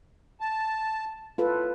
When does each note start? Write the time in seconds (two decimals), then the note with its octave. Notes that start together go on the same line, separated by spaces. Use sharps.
0.40 A5
1.38 A2 F4 A4 B4